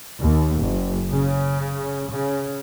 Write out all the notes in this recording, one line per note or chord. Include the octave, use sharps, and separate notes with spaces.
D#2
F#1
C#3
C#3